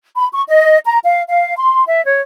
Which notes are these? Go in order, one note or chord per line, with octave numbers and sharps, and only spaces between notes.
B5
C#6
D#5
A#5
F5
F5
C6
E5
C#5